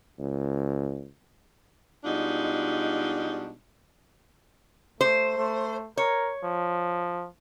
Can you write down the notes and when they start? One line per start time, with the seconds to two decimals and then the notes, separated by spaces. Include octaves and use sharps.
0.19 C#2
2.04 B2 G3 G#3 D4 D#4 F4
5.01 A3 C5
5.38 A3
5.97 A#4 C#5
6.44 F3